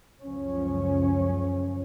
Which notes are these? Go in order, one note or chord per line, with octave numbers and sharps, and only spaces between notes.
C#2 F#2 F3 C#4